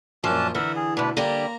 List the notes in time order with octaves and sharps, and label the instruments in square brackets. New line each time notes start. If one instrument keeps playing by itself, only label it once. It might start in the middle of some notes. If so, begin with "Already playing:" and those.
[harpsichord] F#2 A#2 [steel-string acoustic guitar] F3 [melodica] C#4 D4 A5
[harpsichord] D3 [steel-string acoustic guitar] E3 [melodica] A#4 E5 F#5
[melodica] G#4
[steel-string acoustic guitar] D2 B2 [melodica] D4 B4
[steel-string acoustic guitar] D3 G3 G4 [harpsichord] A#3 [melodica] A#5